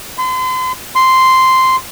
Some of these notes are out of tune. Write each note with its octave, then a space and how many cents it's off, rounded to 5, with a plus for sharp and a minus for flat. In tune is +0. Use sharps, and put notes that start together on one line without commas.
C6 -40
C6 -5